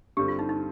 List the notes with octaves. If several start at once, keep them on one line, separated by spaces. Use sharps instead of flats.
G2 D3 G3 C4 G4
F4
D#4
D#4